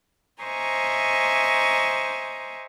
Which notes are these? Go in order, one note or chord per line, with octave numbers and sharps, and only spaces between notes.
C5 D#5 E5 G#5 A#5 C#6